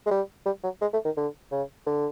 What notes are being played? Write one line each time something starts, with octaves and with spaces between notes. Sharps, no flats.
G#3
G3
G3
F#3
G#3
A3
D#3
D3
C#3
D3